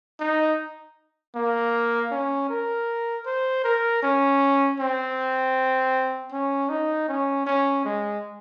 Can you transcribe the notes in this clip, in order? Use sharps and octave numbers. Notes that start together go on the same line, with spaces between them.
D#4
A#3
C#4
A#4
C5
A#4
C#4
C4
C#4
D#4
C#4
C#4
G#3